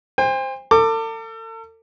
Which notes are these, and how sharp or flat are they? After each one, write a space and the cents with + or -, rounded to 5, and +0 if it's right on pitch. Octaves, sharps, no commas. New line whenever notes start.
C5 +0 G5 +45
A4 +40 D6 +15